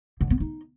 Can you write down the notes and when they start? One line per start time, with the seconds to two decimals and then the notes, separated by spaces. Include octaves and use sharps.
0.21 D3
0.30 B3
0.40 D#4